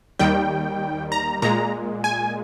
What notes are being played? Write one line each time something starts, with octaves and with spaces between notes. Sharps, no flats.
D#2 D#3 G3 G5
A#5
A#2 G#3 A#5
G#5